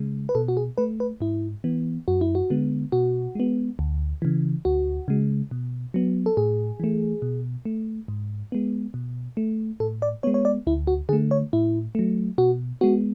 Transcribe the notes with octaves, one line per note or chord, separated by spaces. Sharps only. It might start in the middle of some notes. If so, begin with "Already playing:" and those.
Already playing: C#3 G#3
B4
B2 A4
F#4
G#4
A3 B4
B4
G#2 E4
E3 B3
F#2 F#4
E4
F#4
D3 G#3 B3
B2 F#4
G#3 B3
D2
C#3 E3
D2 F#4
C#3 G#3
B2
F#3 B3
A4
A2 G#4
E3 A3
B2
A3
G#2
G#3 B3
B2
A3
A2 A4
D5
G#3 B3 C#5
C#5
D5
D2 E4
F#4
D3 A3 G#4
C#5
A2 E4
F#3 A3
B2 F#4
G#3 B3 F#4